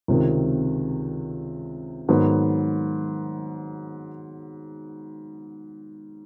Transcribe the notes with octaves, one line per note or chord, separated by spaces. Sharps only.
C#2 C3 D#3
G#2 D#3 F#3 B3